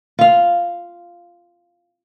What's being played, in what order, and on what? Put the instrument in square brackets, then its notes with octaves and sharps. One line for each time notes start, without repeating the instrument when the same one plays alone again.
[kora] F4 F5